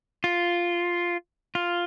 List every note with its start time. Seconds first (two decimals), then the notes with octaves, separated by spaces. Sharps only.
0.24 F4
1.55 F4